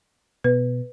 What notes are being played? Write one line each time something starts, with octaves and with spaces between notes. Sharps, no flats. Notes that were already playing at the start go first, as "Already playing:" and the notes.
B2 B4